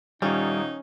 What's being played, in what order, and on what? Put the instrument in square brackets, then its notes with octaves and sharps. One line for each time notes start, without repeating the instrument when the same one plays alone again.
[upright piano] D#1 [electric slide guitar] G3 [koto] C#4 [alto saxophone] D#4